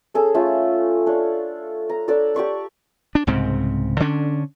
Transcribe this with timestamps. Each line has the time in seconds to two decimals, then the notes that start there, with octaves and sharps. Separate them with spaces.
0.14 C#4 G#4 A4
0.35 A3 C#4 F4
1.07 D4 C#5 F5
1.89 A#5
2.08 D4 A4 C#5 D5
2.34 G4 D5 C#6 D6
3.15 D4
3.27 C2 G#2 C#3 C4
4.00 D3 C#4 D4